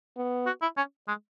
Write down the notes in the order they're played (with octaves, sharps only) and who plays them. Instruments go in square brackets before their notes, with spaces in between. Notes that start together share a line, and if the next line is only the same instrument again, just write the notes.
[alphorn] B3
[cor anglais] F#4
E4
C#4
G#3